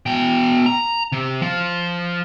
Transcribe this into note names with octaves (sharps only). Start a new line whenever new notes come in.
B2 G5
A#5
C3
F3